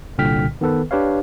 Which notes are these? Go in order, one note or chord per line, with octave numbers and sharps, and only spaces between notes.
C2 A#2 D3 G5 F6 B6
D#3 B3 A4 B4
D4 G4 B4 C#5 F5